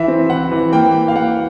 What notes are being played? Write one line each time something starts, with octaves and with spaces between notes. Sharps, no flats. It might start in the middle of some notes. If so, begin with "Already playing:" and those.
Already playing: E3 E5
C4
E3 F#5
E3
A#3 G5
A#3
F5
A#3 F#5